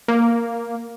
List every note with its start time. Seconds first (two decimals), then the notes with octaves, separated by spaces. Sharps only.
0.08 A#3